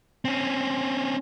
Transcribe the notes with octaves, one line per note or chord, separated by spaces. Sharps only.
C4 C#4